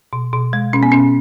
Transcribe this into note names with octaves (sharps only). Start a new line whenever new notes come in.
B2
B2
G#3
B2 C#4
B3
B2 C#4